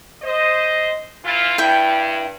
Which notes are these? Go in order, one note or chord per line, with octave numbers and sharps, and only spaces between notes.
C5 D#5
E3 E4 F4
G2 E4 G5